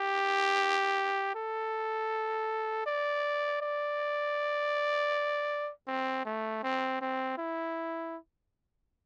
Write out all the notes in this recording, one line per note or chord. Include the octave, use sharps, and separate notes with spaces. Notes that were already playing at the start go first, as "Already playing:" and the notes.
Already playing: G4
A4
D5
D5
C4
A3
C4
C4
E4